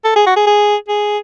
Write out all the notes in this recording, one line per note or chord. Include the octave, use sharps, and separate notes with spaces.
A4
G#4
F#4
G#4
G#4
G#4